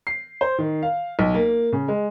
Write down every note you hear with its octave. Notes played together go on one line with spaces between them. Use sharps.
C7
C5
D#3
F5
B1
A#3
C#3
G#3